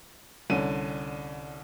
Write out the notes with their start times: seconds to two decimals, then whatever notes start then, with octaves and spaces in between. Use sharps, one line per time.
0.50 C2 D3 C#4 D#7